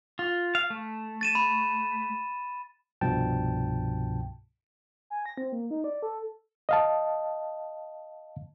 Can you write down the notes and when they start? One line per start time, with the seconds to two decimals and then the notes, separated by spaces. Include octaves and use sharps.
0.19 F4
0.55 F5
0.70 A3
1.21 A6 D#7 E7
1.35 B5
3.01 C2 G2 B2 F3 G5 A5
5.10 G#5
5.26 A#6
5.38 C4
5.52 A#3
5.71 D#4
5.84 D5
6.03 A4
6.69 D#5 F5 A5